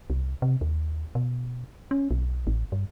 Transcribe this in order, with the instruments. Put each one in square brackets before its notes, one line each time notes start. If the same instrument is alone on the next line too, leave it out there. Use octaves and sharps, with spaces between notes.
[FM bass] C2
C3
D#2
B2
C#4
B1
A1
G2